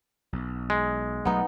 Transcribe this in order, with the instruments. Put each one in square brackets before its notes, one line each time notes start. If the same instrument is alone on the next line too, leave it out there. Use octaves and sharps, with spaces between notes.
[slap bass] B1
[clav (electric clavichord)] G#3
[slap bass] B1 F#3 A3 [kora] B3 D#4